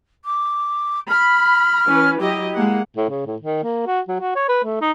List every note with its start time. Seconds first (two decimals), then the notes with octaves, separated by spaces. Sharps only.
0.25 D6
1.09 B5 F6
1.86 E3 C#4 B4
2.20 F#3 E4 G4 D#5
2.54 G#3 A#3 F#5
2.97 A2
3.10 C#3
3.26 A2
3.42 D#3
3.63 A#3
3.86 F#4
4.08 F#3
4.20 F#4
4.36 C#5
4.48 B4
4.64 A3
4.81 D#4